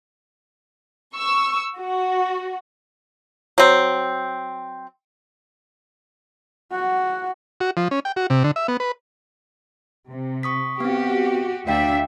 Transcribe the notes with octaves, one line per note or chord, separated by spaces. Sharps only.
C#6 E6
F#4
F#3 C4
F#4 F#5
F#4
F3
C#4
G5
F#4
C3
D3
E5
B3
B4
C3
C#6 D#6 B6
B3 C4 F#4 G4
D2 D4 F#4 E5 F5 G5